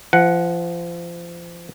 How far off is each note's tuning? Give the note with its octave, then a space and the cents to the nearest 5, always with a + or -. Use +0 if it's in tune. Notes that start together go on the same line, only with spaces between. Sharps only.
F3 -30 F#5 +0